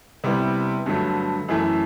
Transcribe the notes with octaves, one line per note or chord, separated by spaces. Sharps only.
C3 G3 B3 E4
G2 D3 F#3 A3
F#2 E3 A3 E4